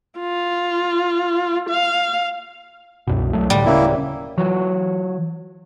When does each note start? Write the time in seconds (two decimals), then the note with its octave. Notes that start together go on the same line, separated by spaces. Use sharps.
0.19 F4
1.69 F5
3.07 C2 F#2 B2
3.33 C2 F#3 A3
3.50 C2 A2 D3 G3
3.65 D1 C#3 A#3 C#4 E4
4.37 E3 F#3 F#4 C#5